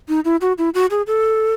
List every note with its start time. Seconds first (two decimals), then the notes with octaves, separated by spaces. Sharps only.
0.09 D#4
0.25 E4
0.41 F#4
0.58 E4
0.74 F#4
0.91 G#4
1.07 A4